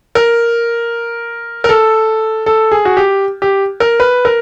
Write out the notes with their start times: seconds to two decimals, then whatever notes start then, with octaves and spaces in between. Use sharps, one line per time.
0.15 A#4
1.64 A#4
1.69 A4
2.46 A4
2.71 G#4
2.85 F#4
2.97 G4
3.42 G4
3.80 A#4
4.00 B4
4.25 A#4